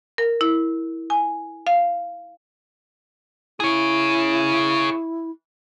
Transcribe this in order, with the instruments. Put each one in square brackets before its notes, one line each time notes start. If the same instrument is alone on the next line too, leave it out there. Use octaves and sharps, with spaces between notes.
[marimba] A#4
E4
G#5
F5
[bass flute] E4 [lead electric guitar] G#4 C#5